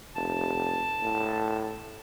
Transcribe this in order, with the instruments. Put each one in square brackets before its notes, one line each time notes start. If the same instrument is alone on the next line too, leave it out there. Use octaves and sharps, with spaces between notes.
[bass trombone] F1 [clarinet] A5
[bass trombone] A2